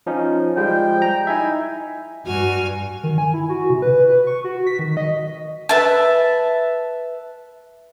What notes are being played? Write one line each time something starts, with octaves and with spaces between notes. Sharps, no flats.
F3 C#4 D#4
F3 G3 G#3 G5
A#5
D#4 E4 E5 G#5
G2 F#4 G#5 F6
D#3
G#5
E4
F#4
C3
B4
B4
C#6
F#4
B6
D#3
D#5
B4 E5 A5